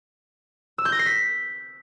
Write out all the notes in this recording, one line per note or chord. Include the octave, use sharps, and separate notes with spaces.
E6
G6
A#6
C7
B6